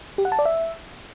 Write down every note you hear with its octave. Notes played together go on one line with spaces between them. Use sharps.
G4
F#5
A5
D5
E5